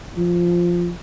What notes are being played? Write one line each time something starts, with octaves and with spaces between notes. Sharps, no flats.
F3